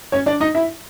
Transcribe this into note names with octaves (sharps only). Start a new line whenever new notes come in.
C#4 C#5
D4 D5
D#4 D#5
E4 E5